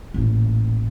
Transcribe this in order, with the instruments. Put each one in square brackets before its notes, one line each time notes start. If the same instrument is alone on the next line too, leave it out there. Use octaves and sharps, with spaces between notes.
[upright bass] A1 A#2